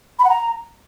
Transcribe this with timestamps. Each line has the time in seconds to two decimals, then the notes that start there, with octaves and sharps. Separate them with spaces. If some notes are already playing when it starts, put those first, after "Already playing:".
0.18 B5
0.24 F#5
0.29 A#5